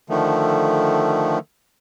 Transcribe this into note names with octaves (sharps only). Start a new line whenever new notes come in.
D3 D#3 F3 A3